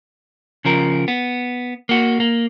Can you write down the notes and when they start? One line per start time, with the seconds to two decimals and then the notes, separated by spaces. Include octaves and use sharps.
0.65 C#3 F3 A#4
1.08 B3
1.89 A#3 F#4
2.20 A#3